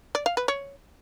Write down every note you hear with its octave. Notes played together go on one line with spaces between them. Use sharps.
D5
F5
B4
C#5